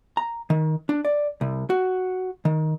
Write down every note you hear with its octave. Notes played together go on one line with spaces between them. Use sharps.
A#5
D#3
D4
D5
C2
F#4
D#3